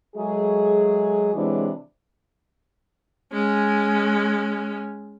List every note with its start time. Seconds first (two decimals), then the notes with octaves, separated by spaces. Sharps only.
0.16 F#3 G#3 A3 G#4
1.35 C3 E3 F#3 G#3 D4 E4
3.32 G#3 C#4